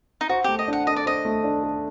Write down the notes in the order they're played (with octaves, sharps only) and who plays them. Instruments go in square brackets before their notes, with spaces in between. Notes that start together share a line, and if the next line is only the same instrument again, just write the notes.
[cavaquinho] D#4
[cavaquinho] F#4 [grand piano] C5
[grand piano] A3 [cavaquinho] G4
[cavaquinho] D#5
[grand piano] D4
[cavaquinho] F#5
[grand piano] A4 [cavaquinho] D#5
[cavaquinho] D5
[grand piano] C5 [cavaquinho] D#5
[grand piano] A3
D4
A4